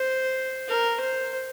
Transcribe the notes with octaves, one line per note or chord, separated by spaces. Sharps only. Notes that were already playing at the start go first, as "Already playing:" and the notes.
Already playing: C5
A#4
C5